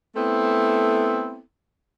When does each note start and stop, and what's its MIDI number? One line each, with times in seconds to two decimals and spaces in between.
0.16 1.40 57
0.16 1.40 59
0.16 1.40 60
0.16 1.40 64
0.16 1.40 69